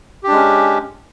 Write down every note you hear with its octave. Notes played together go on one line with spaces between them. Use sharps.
G#3 C#4 D4 G4